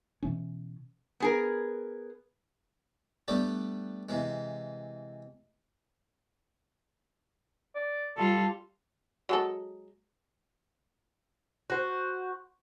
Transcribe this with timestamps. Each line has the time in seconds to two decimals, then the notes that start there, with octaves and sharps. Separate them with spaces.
0.23 B2 E3 C#4
1.20 B3 G#4 A#4
3.28 G3 A3 B3 D4 G4
4.09 C3 E3 G#3
7.75 D5
8.17 G3 F4 A4
9.29 F#3 G#3 A4
11.70 F#4 C5